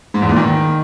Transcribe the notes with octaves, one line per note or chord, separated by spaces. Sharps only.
G#2
E2
A#2
D#3